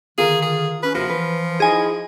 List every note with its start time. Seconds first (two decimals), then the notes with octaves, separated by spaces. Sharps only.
0.18 D3 D#3 F4 G#4 A#4
0.42 G#4
0.83 C#4 B4
0.95 D#2 C3 F3 F#4 A#4
1.09 E3 B4
1.60 D#4 E4 G#4 D#5 G#5